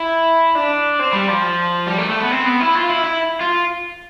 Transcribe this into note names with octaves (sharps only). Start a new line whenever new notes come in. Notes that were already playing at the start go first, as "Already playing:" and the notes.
Already playing: E4
D4
C4
G3
F3
G3
A3
A3
B3
C4
B3
E4
F4
E4
E4
F4